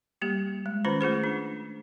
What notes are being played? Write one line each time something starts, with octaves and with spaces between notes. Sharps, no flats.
G3 A#3 G4
G#3
D#3 C#4 F4 B4 C5
A3 F4 G#4 C5
D4